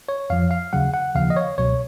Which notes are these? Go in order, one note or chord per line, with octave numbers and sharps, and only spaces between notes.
C#5
F2 F3 F5
F5
D#2 C#3 F#3 F#5
F#5
D#2 C#3 F3 F5
D#5
C#5
C#2 B2 F#3 C#5